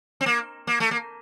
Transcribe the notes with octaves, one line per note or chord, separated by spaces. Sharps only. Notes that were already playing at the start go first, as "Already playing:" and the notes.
C4
A#3
A#3
A3
A#3